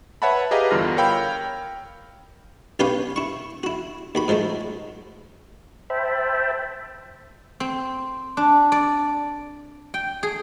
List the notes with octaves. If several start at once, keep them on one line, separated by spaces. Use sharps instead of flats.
B4 C#5 E5 F#5 A5 B5
G4 G#4 B4 D#5 F5 A#5
E2 G2 D3 F4 F6 A#6
A#4 C#5 F5 G5 B5 E6
B1 C#4 G4 B4 C#5 F5
E4 C#6
E4 F#4
D#2 F#4 B5
G#2 F3 F#3 G#3 A3
C5 E5 G5 A5 B5
C4
D4
D5
G5
G#4